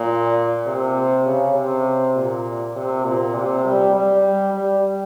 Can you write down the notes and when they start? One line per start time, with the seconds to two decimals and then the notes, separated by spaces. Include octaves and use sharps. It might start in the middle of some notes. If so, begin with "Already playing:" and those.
Already playing: A#2
0.67 C3
1.26 C#3
1.55 C3
2.16 A#2
2.76 C3
3.05 A#2
3.35 C3
3.65 G3
3.95 G3
4.54 G3